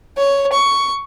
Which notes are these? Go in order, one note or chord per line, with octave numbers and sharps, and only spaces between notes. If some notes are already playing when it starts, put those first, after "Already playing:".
C#5
C#6